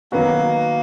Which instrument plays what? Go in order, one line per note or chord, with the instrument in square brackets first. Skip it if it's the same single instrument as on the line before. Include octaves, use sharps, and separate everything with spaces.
[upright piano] D#3 F#3 B3 F#4 [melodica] A#3